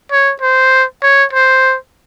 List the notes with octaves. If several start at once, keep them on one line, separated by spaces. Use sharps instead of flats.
C#5
C5
C#5
C5